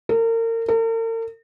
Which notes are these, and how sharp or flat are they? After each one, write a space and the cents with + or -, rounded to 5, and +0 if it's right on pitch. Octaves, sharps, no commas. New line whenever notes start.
A#4 -35
A#4 -45